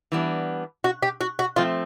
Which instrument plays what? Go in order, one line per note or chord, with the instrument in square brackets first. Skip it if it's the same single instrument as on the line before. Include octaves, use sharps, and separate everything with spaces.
[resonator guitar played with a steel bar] E3 G3 B3 D4
[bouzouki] F#4
G4
F#4
F#4
[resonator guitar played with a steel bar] F3 A3 C4 [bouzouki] F4